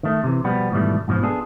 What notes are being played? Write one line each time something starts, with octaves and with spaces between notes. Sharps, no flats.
D#3 A3
C3 E3
B2 F3 G3 B3
G#2 B2 D#3 E3 G3 A3
G#2 B2 D3 F3
B3 D4 F4 G#4 A4